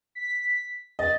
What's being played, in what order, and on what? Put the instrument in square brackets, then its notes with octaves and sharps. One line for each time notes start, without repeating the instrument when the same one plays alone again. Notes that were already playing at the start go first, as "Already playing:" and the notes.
[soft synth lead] B6
[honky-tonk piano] D#5 [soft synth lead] A6